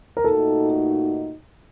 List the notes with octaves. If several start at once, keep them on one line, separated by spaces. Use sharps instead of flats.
A#4
A#2 A3 D#4 F#4 A4